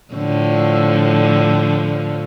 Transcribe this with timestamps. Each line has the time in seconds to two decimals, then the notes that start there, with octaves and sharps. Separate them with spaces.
0.14 A2 D3 F3